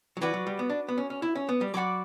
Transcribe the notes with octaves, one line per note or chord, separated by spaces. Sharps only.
F#3
E3 F#4 B4 D5 F#5
F#3
G3
B3
D4
B3
C#4
C#4
E4
C#4
B3
G3
F#3 D5 F#5 B5 D6